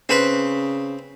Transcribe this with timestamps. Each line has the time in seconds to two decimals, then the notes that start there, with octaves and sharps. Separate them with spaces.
0.09 C#3 C4 B4